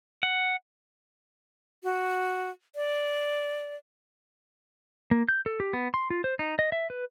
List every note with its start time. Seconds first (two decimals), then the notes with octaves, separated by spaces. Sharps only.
0.23 F#5
1.84 F#4
2.75 D5
5.11 A#3
5.29 G6
5.46 A4
5.60 G4
5.73 B3
5.94 C6
6.10 F4
6.24 C5
6.39 D#4
6.59 D#5
6.72 E5
6.90 B4